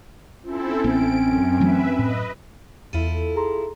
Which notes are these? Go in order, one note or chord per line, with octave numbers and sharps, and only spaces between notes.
C4 C#4 E4 F4 A4
A1 B3 C4 D7
F#2
E3 F#3 A3 B4 E5
A2 B4 D#5
E2 E4 F4 A4 D#7
G#4 A#5 C6